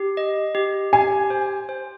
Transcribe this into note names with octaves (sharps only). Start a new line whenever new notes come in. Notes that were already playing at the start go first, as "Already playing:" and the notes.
Already playing: G4
D#5
G4
G4 G#5
C5
C5